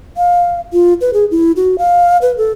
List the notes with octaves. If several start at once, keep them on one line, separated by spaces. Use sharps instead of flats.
F5
F4
B4
G#4
E4
F#4
F5
B4
A4